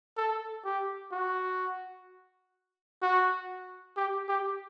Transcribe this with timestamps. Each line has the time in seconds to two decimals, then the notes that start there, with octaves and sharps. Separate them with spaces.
0.17 A4
0.65 G4
1.12 F#4
3.02 F#4
3.97 G4
4.28 G4